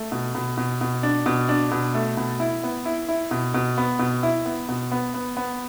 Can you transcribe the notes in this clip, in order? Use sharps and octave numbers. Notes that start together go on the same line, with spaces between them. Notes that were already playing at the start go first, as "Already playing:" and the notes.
Already playing: A3
B2
B2
B2
B2
D4
B2
D4
B2
A3
B2
E4
B3
E4
E4
B2
B2
B3
B2
E4
B3
B2
B3
B3
B3